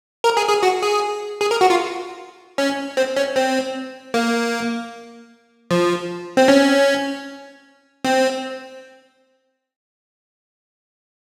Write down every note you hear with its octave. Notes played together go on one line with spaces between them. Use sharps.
A#4
G#4
G#4
F#4
G#4
G#4
A#4
F#4
F4
C#4
C4
C#4
C4
A#3
F3
C4
C#4
C4